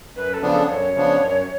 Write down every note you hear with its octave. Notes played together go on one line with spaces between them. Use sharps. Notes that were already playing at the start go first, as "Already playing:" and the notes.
F#2 B4
A4
C#3 F3 B3 D4
A4
F#2 C#5
C#3 F3 B3 D4
F#2